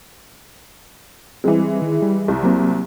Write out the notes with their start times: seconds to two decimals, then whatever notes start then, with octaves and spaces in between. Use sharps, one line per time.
1.44 E3 G3 G#3 C4
1.82 D#3
2.03 G3
2.28 C2
2.43 F#3 A#3 C4